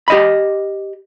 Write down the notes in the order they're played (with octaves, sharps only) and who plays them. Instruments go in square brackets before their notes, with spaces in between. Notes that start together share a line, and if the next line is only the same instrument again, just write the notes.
[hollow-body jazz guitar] G4 D#5 B5